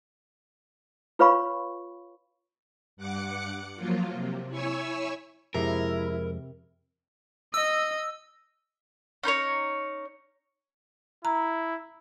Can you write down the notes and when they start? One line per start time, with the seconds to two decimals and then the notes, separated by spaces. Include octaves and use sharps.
1.19 F4 B4 C#5 F5 B5 C#6
2.97 G2 F#5 D6 F#6 C#7
3.76 F3 F#3 A#3 F4
4.12 C3
4.49 E4 C#5 G#5 C#6 E6
5.54 F2 C3 G#3 E4 A#4
7.54 D#5 E6
9.23 C#4 D#4 C5 C#5
11.25 E4 A#5